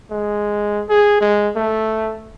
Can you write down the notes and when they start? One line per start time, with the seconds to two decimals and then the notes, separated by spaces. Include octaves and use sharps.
0.11 G#3
0.89 G#4
1.21 G#3
1.56 A3